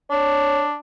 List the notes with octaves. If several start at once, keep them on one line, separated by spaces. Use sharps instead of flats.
D4 C#5